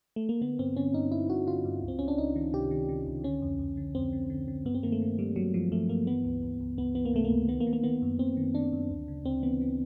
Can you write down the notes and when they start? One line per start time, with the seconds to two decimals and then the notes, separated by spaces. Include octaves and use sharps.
0.16 A3
0.29 A#3
0.41 D3 B3
0.59 G2 C4
0.76 D3 C#4
0.94 G2 D#4
1.12 G2 E4
1.30 G2 F#4
1.47 D3 F4
1.65 G2
1.83 C#2
1.88 C4
1.99 C#2 C#4
2.08 D4
2.18 C#2 D#4
2.36 D#3
2.53 C3 G4
2.71 D#3
2.89 D#3
3.06 C#2
3.24 D3 C#4
3.42 F2
3.59 F2
3.77 D3
3.95 F2 C4
4.13 D3
4.30 D3
4.48 D3
4.65 G2 B3
4.75 C4
4.83 D#3 A#3
4.92 A3
5.02 D#3
5.19 G2 G3
5.36 G2 F#3
5.54 G2 F3
5.72 G2 A3
5.89 G2 A#3
6.07 E3 B3
6.25 C#2
6.43 C#2
6.61 C#2
6.78 C#2 B3
6.95 E3 B3
7.05 A#3
7.14 C3 A3
7.24 A#3
7.31 C#2
7.48 D#3 B3
7.60 A#3
7.67 D#3
7.73 A#3
7.84 D#3 B3
8.02 F#2
8.19 F#2 C4
8.37 D#3
8.55 D#3 D4
8.73 F#2
8.90 D2
9.08 C#3
9.25 D2 C4
9.43 E3 B3
9.61 E3